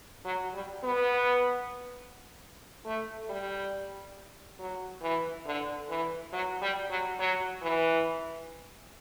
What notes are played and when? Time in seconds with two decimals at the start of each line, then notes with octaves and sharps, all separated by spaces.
0.25 F#3
0.54 G3
0.84 B3
2.85 A3
3.29 G3
4.59 F#3
5.02 E3
5.46 D3
5.89 E3
6.32 F#3
6.62 G3
6.90 F#3
7.19 F#3
7.62 E3